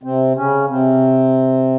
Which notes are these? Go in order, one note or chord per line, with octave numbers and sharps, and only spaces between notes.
C3 C4
C#3 C#4
C3 C4